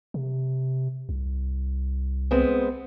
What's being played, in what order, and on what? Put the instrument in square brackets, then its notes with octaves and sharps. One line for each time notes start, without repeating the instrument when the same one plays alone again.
[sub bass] C3
C2
[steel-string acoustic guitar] G#3 B3 C4